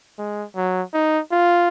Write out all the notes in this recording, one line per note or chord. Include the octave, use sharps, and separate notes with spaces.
G#3
F#3
D#4
F4